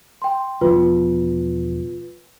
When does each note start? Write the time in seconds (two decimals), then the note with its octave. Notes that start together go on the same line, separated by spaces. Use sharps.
0.22 G5 C6
0.61 E1 F3 B3 F4 B4